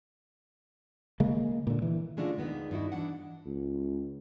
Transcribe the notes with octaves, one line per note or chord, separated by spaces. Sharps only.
C#3 G#3 A#3
A#2 D3
E3
C#3 G#3 A3 D4 F4 F#4
D#2 D3 D#3 G#3 B3
G2 D#4 E4 F#4
E3 D4 F#5
C#2